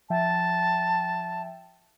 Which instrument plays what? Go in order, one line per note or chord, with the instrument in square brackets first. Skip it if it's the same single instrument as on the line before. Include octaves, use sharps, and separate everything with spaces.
[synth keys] F3 E5 G5 [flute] A5